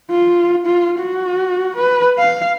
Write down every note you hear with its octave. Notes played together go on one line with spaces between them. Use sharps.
F4
F4
F#4
B4
F5